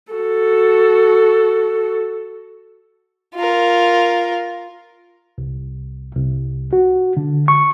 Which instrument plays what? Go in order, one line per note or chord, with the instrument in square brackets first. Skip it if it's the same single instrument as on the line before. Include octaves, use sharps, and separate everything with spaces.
[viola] F#4 A4
[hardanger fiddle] F4 A#4
[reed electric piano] C2
C2
F#4
D3
C#6